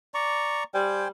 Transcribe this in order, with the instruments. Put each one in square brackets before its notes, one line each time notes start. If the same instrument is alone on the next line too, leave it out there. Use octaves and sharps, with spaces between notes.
[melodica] D5 A#5 C#6
[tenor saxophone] G3 [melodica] C5 G5 G#5